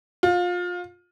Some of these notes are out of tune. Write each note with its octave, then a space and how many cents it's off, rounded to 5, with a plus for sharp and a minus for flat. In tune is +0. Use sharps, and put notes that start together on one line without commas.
F4 +25